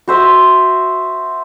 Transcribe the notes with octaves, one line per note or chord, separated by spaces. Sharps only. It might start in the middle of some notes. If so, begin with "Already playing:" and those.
F#4 C5 E5